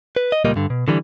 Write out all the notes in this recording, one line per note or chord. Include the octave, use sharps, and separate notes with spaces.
B4
D#5
C#2 A#2 G3 A#3 D#5
G2 D3
B2
D3 E3 G3